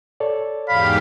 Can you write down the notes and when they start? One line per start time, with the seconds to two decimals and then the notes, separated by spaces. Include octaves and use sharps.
0.20 A4 C#5 D5
0.69 E2 G#2 G4 F5 B5